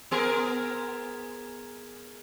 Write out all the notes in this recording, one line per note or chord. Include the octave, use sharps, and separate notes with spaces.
B3 G#4 A#4